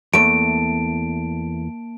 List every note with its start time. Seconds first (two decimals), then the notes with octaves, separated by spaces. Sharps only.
0.13 E2 A3 A#3 A5 D7